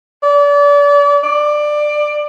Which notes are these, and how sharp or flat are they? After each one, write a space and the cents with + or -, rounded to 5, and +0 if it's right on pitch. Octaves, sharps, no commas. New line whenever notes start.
D5 -35
D5 +20